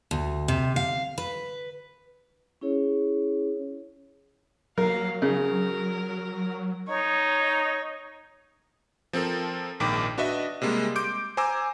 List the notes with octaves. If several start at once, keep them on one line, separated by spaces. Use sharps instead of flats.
D2
C3
F5
B4
C#4 E4 G#4 C#5
F#3 A#3 A#4 F5
C#3 A#4
D#4 C#5
F3 C4 A4 A#4
A#1 G#2 D#3 G5 D6
D4 F#4 B4 D#5 E5
C3 G3 G#3 A#3
C6 D6 G6 D7
C5 G#5 A#5 D6 E6